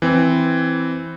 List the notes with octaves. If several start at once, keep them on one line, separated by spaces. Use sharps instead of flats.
E3 C4